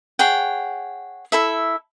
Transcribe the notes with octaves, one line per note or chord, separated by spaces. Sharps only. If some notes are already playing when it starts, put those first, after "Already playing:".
G#4 C#5 F#5 G5
E4 A4 E5